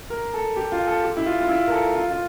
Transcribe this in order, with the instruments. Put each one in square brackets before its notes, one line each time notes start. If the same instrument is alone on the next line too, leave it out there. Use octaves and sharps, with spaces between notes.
[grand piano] A#4
A4
G4
F4
A4
G4
E4
F4
F4
E4
A#4
A4
F4
F4